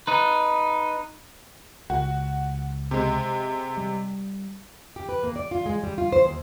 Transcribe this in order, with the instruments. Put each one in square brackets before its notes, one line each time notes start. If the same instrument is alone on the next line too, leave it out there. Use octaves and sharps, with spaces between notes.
[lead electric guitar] D#4 B4
[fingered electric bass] C#2 [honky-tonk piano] F#4
[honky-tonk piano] C3 G#3
[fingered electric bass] G3
[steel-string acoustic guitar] G4
B4
A#3
D5
F4
G#3
G3
F4
C5
D#2